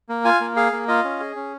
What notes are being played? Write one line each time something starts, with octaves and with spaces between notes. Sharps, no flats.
A#3
F4 G#5
A#3
G#4 F5
A#3
F4 D#5
C#4
G#4
C#4